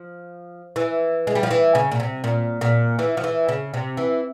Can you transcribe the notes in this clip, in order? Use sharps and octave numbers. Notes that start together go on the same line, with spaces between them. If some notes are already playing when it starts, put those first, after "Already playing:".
Already playing: F3
E3
G#3
G3
F3
E3
C#3
A#2
C3
A#2
A#2
E3
F3
E3
C#3
C3
E3